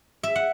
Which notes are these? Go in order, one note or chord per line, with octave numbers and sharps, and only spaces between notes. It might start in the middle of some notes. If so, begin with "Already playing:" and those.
E5
F#5